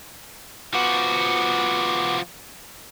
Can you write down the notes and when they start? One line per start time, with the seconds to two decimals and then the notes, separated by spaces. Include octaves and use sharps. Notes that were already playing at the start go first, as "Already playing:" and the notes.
0.73 F3 B3 F#4 D6